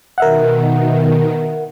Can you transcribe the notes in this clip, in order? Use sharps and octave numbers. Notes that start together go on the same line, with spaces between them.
B2 D#3 A#4 E5 F#5